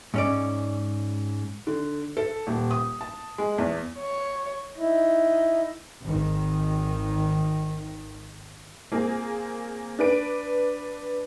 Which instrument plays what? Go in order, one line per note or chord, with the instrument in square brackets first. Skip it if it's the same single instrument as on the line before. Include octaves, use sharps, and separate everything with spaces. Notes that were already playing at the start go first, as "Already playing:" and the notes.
[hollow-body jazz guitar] G#2 C#4 D5
[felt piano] D3
A4
D#1
D#6
A5
G#3
E2
[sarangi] C#5
[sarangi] D#4 [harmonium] E4
[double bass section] G#1 D#3
[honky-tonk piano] A#3 C4 F4 G#4
D4 B4 D7